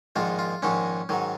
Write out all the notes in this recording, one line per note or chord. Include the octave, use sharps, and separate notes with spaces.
A#1 G#2 D#3 G#3 F4
F4
A#1 G#2 D#3 G#3 C#4
G#2 D#3 F#3